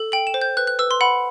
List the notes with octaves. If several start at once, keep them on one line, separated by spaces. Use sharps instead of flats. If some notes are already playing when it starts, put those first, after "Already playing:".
Already playing: A4
G5 F#7
E7
C5
G6
B4 F#6
F#6
B4 E6
C6
F#5 B5